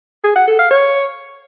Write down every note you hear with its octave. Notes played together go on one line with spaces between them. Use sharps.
G#4
F#5
A4
F5
C#5